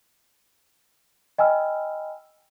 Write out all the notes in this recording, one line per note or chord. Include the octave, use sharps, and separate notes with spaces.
D#5 G5 G#5 B5 E6 F6